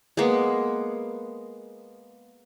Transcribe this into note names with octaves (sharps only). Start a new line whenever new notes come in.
G#3 A#3 B3